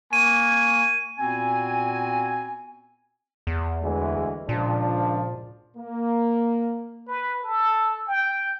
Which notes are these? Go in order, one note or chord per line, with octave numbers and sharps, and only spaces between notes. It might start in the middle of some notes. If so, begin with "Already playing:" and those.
A#3 G#5 C#6 D#7
A#2 B3 C4 F#4 G#5
E2
D2 E3 G#3
C#2 A#2 F3 D4
A#3
B4
A4
G5